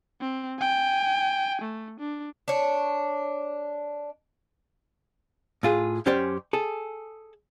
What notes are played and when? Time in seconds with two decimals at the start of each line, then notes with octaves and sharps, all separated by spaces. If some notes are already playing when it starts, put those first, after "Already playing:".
0.21 C4
0.59 G5 G#5
1.62 A3
2.00 D4
2.48 D4 C#5
5.63 A2 F4 G#4
6.06 F#2 C#4 G4 C5 D5
6.53 G#4 A4